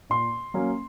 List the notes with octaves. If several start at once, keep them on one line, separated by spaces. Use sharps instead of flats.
A#2 C6
F#3 A#3 C#4